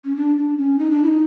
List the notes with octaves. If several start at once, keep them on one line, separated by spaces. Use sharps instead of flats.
C#4
D4
D4
C#4
D#4
D4
E4
D#4